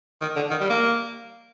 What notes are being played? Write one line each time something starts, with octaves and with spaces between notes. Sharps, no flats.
D#3
D3
D#3
G3
A#3